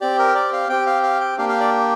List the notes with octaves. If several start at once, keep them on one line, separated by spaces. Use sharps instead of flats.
C4 G4 D5
A#4
D5
F5
C4 G4 G5
F5
F5
G5
A#3 D4 G4 F5
F5
D5